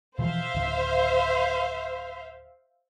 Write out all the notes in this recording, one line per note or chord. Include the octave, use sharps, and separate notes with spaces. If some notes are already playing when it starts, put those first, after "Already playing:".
B2 E3 F3 C5 E5 F5
D1 D#3